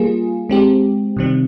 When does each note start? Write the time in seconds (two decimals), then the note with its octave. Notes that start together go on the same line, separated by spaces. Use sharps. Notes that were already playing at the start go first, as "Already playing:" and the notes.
Already playing: G3 A#3 F4 G#4
0.50 G#3 C4 G4
1.17 C3 D#3 G3 C4